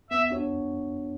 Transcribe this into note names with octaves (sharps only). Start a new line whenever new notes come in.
B3 E5
D4 F#4 C#5